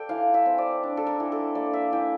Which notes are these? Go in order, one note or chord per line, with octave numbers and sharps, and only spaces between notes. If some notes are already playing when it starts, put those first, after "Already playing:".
Already playing: A4 D5 G5
E3 F5
E5
C4
D5
D4
A4
A#4
E3
A4
A#3 D5
E5
E3 G5